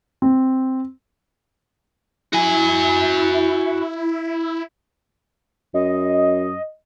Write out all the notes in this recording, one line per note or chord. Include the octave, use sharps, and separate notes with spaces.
C4
E4 F#4 G#5
F#2 D#5